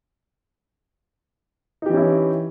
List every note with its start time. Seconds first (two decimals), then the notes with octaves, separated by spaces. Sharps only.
1.82 D#4
1.86 G4
1.90 E3
1.93 C#4
1.97 E4